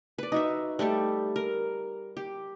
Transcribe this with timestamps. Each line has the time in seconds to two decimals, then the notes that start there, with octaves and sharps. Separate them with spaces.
0.18 B4 D5
0.32 D#4 F#4 E5
0.79 G3 A3 G4 A4
1.36 A#4
2.17 G4